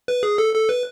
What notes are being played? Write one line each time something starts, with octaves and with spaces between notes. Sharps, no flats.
B4
G#4
A4
A4
B4